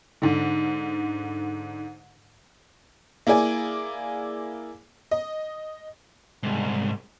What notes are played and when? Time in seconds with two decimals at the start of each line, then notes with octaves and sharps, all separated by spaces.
0.22 G#2 D3
3.27 A#3 E4 G#4 D5 G#5
5.11 D#5
6.43 C2 G#2